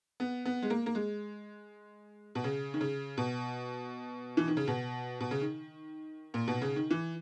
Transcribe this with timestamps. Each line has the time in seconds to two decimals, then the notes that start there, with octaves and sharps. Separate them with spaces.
0.20 B3
0.45 B3
0.62 G#3
0.70 A#3
0.86 A#3
0.95 G#3
2.35 B2
2.44 C#3
2.74 D#3
2.81 C#3
3.17 B2
4.37 E3
4.48 D#3
4.57 C#3
4.67 B2
5.20 B2
5.31 C#3
5.41 D#3
6.34 A#2
6.48 B2
6.61 C#3
6.76 D#3
6.91 E3